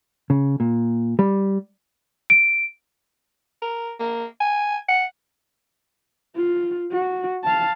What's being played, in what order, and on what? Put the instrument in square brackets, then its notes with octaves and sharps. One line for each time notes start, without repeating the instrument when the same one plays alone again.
[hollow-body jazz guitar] C#3
A#2
G3
[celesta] D7
[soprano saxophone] A#4
A#3
G#5
F#5
[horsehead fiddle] F4
F#4
F5 A5